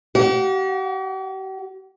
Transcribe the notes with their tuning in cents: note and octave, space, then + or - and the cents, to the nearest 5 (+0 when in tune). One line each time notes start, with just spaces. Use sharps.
G4 -45 F#5 -30